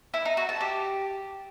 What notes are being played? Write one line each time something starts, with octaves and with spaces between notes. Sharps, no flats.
E4
D#4
F#4
A5
G4